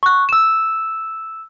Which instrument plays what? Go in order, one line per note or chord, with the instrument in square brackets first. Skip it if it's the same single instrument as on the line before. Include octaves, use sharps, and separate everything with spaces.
[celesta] C#6 F#6
E6 E7